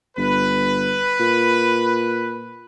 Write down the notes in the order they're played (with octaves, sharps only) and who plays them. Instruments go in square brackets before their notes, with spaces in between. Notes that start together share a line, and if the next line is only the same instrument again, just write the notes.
[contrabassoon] G1 [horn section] B4
[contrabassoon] A#2